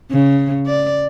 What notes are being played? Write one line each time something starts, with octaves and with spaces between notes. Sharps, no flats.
C#3
D5